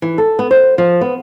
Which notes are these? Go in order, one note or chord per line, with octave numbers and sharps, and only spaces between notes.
E3
A4
B3
C5
F3
B3